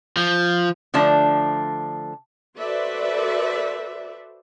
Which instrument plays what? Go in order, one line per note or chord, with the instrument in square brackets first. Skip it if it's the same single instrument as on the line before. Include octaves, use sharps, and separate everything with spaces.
[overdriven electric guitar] F3
[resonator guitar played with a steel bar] D3 F3 A3 D4
[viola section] F#4 A4 B4 C5 D5 E5